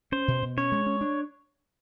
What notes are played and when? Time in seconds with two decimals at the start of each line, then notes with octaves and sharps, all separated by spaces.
0.12 C#4 C5
0.28 B2
0.43 B2
0.57 C#4 C#5
0.72 G#3
0.86 C#4
1.01 D4